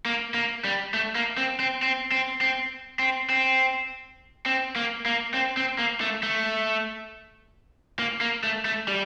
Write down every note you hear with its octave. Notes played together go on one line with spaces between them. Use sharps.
A#3
A#3
G3
A3
A#3
C4
C4
C4
C4
C4
C4
C4
C4
A#3
A#3
C4
C4
A#3
A3
A3
A#3
A#3
A3
A3
G3